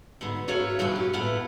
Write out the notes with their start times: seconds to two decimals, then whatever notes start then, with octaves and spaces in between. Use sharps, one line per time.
0.21 G#2 D3 B3
0.48 A3 F#4 A4 A#4 C#5 F5
0.79 G2 B2 E3 F3 F#4
0.96 G4
1.13 E2 A2 B3 F4 F#5